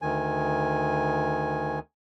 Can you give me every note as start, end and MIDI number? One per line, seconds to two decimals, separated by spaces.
0.02 1.79 38
0.02 1.79 51
0.02 1.79 80